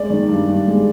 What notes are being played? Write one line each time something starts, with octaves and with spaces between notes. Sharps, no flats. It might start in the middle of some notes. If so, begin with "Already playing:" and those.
Already playing: G#3 D5
D#3
G2
G2
G#3